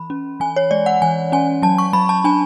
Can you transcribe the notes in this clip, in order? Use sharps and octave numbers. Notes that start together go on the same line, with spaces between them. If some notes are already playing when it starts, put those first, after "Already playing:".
Already playing: E3 B5
C#4
E3 G#5
C#5
G#3 D5
F#5
E3 G#5
C#4 G#5
F#3 A5
C#6
F#3 B5
A5
D4 G#5